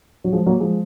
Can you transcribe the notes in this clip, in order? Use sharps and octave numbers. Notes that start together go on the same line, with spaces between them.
F#3
F3 G#3
F#3 A#3
F3 G#3